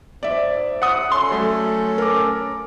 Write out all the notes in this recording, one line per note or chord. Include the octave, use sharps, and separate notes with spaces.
G#2 D5 E5
F#5 D#6
C#4 A4 C6
F#3 A3
A#4 D6